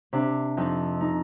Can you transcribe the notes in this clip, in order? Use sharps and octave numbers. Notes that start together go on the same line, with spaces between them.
C3 D4
F2 D#4
D#4